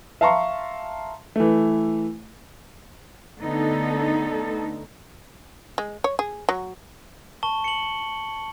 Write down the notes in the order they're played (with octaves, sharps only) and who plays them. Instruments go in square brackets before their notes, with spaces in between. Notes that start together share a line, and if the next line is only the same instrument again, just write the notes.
[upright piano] E5 F5 A5 A#5 C6 C#6
E3 A3
[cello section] D3 A3 B3 D#4 A4
[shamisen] G#3
C#5
G#4
F#3
[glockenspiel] A5 C#6 G7
C#7 F#7